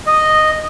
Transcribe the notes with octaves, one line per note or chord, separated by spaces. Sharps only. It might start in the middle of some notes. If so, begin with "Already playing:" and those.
D#5